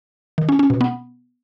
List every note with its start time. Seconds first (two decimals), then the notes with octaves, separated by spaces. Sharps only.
0.38 D#3
0.49 C#4
0.59 C#4
0.70 B2
0.81 B3